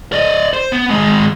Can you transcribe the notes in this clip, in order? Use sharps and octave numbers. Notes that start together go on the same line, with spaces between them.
D5 D#5
C5
B3
D#3 G#3